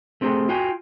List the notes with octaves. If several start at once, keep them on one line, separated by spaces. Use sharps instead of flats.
A3 C4 E4 G4 G#4
F4 F#4 F5 G5 G#5